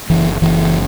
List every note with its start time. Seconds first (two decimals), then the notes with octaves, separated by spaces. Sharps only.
0.10 F#1 E3
0.42 F#1 E3